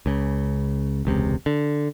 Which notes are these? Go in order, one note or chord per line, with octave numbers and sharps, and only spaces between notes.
C#2 C#3
E1 C#2 C3
D3